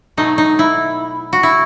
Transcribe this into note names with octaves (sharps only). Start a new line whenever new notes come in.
B2 F#3 A3 D#4
D#4
E4
F#4
E4